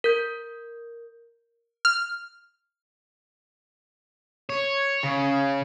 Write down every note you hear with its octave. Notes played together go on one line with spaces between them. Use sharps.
A#4 G6
F6
C#5
C#3